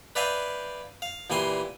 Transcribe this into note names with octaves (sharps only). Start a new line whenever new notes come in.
B4 D5 E5 F5 G5 G#5
F5
A#2 E3 G3 G#5 C6